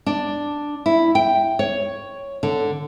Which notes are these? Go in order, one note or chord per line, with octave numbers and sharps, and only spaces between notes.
D4
E4
G5
C#5
D3